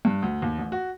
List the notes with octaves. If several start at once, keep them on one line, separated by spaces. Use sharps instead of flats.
G2
D2
D#2
A1
F#4